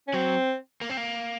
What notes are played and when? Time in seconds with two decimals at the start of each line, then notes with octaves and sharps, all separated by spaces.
0.08 C#4
0.14 F#3 C4
0.81 A#3
0.89 C4
0.97 A#3